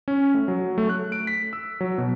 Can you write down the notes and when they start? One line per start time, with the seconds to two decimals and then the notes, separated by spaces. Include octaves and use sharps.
0.08 C#4
0.34 A3
0.48 F#3
0.78 A3
0.89 F#6
1.12 D7
1.27 B6
1.53 E6
1.81 F#3
1.98 B2